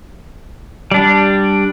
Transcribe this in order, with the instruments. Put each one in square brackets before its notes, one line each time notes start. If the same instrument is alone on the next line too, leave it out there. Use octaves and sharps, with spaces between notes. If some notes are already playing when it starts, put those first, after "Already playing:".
[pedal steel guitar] G3 D4